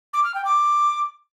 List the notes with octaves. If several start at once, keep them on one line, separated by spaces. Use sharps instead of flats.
D6
F6
G5
D6